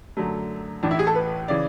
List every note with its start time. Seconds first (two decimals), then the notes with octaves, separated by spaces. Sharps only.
0.17 F#2 D3 F#3 A3
0.83 A1 A2 E3 D4
0.91 E4
0.99 G#4
1.07 A4
1.15 B4
1.48 C#3 E3 D5